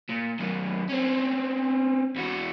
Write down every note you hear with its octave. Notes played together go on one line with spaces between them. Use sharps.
A#2
F#2 D#3
C4 C#4
E2 F#4